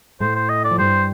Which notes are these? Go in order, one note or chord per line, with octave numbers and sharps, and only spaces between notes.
A2 A3 C5
C5
D#5
D5
F3
G2 G3 C5